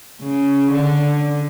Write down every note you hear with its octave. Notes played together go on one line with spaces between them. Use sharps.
C#3
D3